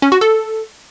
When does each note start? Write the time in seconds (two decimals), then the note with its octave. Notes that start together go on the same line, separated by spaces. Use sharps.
0.02 C#4
0.12 F#4
0.21 A4